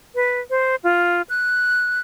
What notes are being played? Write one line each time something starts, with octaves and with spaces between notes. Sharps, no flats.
B4
C5
F4
F#6